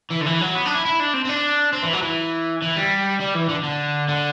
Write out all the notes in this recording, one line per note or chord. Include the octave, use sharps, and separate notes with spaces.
E3
D3
E3
F#3
B3
D4
E4
E4
D4
C4
C4
D4
C4
E3
F#3
E3
E3
G3
G3
E3
D3
D3
D3